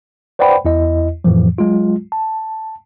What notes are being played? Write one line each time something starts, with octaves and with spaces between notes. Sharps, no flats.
B4 C5 D5 F#5 G5 B5
E2 E4 D#5
F2 A2 E3 F3
F#3 G#3 F4
A5